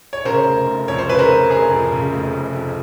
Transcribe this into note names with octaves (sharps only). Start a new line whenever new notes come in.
C#5
C#3 A#4 C5
F1
F1
F2 C#5
C5
C#3 B4
A#4 C5
F1
F1 G#4 A#4
F2
C#3
F1
F1
F2